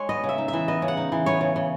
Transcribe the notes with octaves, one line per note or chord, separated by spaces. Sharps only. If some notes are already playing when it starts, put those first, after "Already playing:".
Already playing: G#3 C#5
B3 D#5
C#3
E5
D#4
E5
E3
B3 D#5
C#3
F#5
D#4
E3
B3 C#5
C#3
C#3